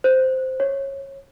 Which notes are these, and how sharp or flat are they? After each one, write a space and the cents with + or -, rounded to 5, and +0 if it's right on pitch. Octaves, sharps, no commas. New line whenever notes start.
C5 -5
C#5 -20